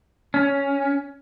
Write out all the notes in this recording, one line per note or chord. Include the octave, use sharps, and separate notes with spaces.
C#4